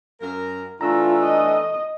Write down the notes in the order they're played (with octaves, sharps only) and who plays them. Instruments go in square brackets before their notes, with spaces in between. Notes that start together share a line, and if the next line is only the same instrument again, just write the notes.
[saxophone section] F#2 A#4
[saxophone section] E3 A3 D4 [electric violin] F4 [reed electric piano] A#5 E6
[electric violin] D#5